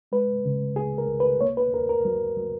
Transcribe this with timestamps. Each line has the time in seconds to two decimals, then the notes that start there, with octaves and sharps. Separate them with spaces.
0.12 G#3 B4
0.45 C#3
0.76 C#2 G#4
0.98 A#4
1.09 C#2
1.20 B4
1.41 A#3 C#5
1.57 B4
1.73 D#2 A#4
1.89 A#4
2.05 F#3
2.37 F#3